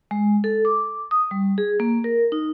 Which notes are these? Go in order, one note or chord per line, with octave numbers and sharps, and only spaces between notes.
G#3
A4
D6
D#6
G3
G#4
A#3
A#4
D#4